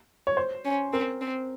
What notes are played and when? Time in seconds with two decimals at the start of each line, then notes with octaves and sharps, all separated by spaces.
0.27 C#5
0.37 C5
0.65 C#4
0.93 C4 A#4
1.21 C4